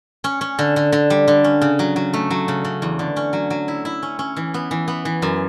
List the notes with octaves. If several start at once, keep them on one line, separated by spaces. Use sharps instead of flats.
C#4
C#4
D3
D3
D3
G3
D3
C#4
C#3
F#3
F#3
A3
F#3
C#3
C#3
E2
D3
C#4
F#3
F#3
E4
E4
C#4
C#4
E3
B3
E3
B3
E3
F#2